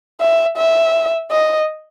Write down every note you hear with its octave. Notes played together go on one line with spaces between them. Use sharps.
E5
E5
D#5